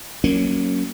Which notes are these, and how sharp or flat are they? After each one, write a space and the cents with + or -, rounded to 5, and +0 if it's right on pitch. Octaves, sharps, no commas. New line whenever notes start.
F#3 +10 A#3 +0 C#4 +0